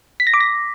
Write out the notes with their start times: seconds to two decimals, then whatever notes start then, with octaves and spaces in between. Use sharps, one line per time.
0.20 B6
0.27 A#6
0.34 D6
0.41 A#6